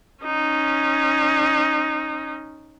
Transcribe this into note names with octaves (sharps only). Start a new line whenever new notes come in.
C#4 D#4